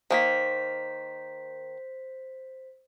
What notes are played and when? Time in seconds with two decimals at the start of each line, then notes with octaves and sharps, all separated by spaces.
0.11 D#3 A#3 C5 B6